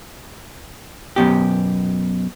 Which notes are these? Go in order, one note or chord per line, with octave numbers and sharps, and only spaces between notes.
F#2 B2 G4